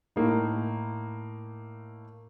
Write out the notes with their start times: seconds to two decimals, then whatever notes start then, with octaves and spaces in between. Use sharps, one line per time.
0.16 A2 A#3 D#4